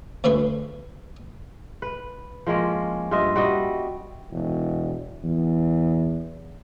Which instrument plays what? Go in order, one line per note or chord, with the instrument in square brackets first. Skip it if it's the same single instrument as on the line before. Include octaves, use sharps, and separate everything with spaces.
[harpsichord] D2 C#3 A3 B4 C6 C#6
[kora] B4
F3 G#3 A#3 C#4
G2 F4 D#5 E5
G3 F#4 D#5 E5
[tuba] E1
E2